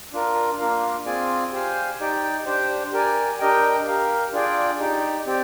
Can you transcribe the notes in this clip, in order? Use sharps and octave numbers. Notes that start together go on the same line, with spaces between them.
D4 F4 A#4
A#3 D4 F4 A#4 F5
C4 F4 G#4 D5 G#5
G4 C5 F5 G#5
D#4 G4 D5 G5
D4 G4 C5
G4 A#4 D5 G#5
D4 G4 A#4 D#5 G5
G4 A#4 F5
D4 F4 G#4 D5 G5
D#4 G4 D5
C4 G4 D5